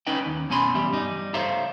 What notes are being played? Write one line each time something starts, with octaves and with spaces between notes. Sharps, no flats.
C#4 D#4 B4 D#5 G5
D#2
F#2 B2 C#4 G#5 B5 C6
E2 G3 G4 E5
G2 G3 D#4
A4 C5 C#5 E5 F5 A#5